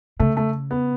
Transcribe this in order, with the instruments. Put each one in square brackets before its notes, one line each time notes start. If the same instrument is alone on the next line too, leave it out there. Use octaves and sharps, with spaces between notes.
[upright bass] C#3 [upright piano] A3
[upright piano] A3
B3